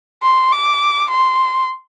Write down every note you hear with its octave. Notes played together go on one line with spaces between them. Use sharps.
C6
D6
C6